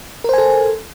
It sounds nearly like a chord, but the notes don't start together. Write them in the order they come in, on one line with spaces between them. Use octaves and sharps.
A#4 C5 G#5 A4